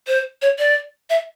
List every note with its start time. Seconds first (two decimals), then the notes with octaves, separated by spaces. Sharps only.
0.07 C5
0.42 C#5
0.58 D5
1.10 E5